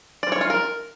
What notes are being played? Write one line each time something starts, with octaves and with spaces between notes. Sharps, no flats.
D5
C#5
F4
A#4